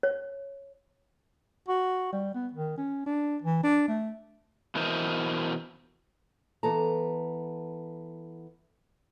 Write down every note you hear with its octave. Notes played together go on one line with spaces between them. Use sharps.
C#5
F#4
G3
B3
D#3
C#4
D4
E3
D4
A3
B2 E3 A#4 C5 D#5
E3 B3 A4 A5 A#5